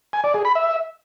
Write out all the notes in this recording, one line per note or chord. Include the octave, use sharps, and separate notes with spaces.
G#5
D5
G#4
B5
E5